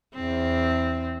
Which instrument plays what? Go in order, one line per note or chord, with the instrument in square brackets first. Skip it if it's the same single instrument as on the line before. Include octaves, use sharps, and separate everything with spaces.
[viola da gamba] E2 C4